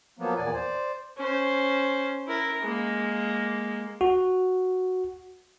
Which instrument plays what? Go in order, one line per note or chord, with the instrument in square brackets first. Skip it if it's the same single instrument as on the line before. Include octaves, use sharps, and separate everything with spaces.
[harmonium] F3 F#3 A#3 B3
E2 A#2 D5 G#5
C5 D5
[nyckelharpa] C#4 C5
E4 A#4
G#3 A#3
[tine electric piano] F#4